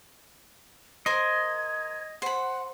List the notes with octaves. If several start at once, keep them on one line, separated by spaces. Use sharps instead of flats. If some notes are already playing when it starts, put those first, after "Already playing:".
A#4 C5 D#5 G#6
C5 F#5 B5